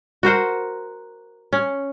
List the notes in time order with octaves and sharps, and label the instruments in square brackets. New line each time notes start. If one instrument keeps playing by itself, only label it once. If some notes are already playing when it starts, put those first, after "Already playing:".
[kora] F#4 A#4 C5 F#5
C#4